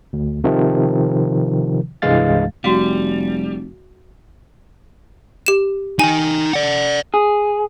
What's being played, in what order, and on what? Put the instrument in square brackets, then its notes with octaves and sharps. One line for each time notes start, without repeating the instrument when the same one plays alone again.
[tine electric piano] D2
C3 D#3 F3
C2 G2 E3 G#3 F5 A6
[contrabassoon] F1 [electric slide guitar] G3 [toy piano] F#4 F5
[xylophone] G4 E7
[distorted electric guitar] D#4 G5 [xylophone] G#5
[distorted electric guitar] D5 F#5
[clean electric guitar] G#4